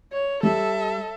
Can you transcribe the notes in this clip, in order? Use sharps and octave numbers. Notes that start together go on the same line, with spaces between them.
C#5
G3 A4 E5